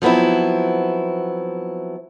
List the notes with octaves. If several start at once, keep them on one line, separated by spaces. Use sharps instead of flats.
F3 F#3 B3 C4 E4